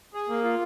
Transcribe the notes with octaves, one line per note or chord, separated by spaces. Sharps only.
G#4
A#3
F4